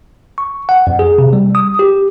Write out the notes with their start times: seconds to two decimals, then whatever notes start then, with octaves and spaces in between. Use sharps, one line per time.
0.38 C#6
0.69 F#5
0.87 F2
0.99 G#4
1.18 C3
1.33 G3
1.55 D#6
1.79 G4